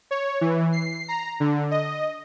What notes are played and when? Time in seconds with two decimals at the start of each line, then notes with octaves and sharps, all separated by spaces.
0.11 C#5
0.41 E3
0.72 C7
1.08 A#5
1.40 D3
1.71 D#5